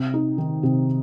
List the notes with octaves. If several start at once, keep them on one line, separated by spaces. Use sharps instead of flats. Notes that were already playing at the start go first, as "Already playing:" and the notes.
Already playing: C3
D#4
D#3
C3